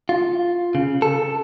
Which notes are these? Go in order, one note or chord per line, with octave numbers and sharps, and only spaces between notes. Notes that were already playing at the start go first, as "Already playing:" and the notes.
F4
C#3
A4